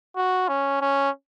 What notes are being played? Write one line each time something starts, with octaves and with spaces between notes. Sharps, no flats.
F#4
C#4
C#4